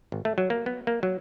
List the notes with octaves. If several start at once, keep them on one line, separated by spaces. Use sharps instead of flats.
G#1
A3
F#3
A#3
B3
A#3
F#3